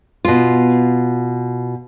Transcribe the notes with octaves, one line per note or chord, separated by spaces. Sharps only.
B2 F4